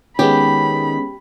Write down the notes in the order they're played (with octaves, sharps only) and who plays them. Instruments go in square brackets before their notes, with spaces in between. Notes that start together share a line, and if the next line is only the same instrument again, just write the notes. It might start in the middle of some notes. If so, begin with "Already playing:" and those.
[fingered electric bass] D#3 [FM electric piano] G#3 B3 C#4 [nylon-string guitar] G4 [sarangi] B5